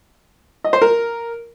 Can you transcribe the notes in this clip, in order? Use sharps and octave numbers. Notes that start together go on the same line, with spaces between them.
D#5
C5
A#4